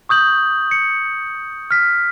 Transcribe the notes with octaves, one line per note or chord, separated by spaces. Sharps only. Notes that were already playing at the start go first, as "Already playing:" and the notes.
C#6 D#6 G6 F#7
C#7
F6 B6